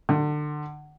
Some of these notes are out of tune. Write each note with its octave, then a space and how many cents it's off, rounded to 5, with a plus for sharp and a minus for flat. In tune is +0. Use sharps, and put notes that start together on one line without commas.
D3 +30